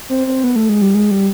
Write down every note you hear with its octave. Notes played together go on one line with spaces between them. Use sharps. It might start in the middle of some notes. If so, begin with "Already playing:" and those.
C4
C4
B3
A3
G#3
G3
G#3
G3